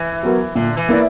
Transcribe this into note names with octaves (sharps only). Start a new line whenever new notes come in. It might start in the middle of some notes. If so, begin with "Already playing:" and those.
Already playing: E3
F#3 B3 F#4 A#4
A#2 D3
E3
A#3 E4 B4 D5